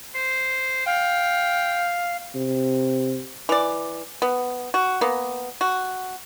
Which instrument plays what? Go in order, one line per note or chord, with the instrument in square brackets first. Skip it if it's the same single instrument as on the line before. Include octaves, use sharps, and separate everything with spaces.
[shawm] C5
[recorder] F5 [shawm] G5
[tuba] C3
[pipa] E3 D5
B3
F#4
A#3 B3
F#4